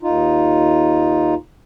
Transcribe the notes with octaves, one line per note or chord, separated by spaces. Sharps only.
D#2 D#4 F4